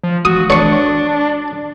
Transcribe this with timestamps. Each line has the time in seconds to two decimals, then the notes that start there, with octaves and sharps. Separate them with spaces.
0.04 F3
0.25 F#4 D#6
0.50 D4 C#5 C#6